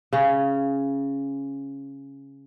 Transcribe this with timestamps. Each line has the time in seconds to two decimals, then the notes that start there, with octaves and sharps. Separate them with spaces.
0.13 C#3 C#4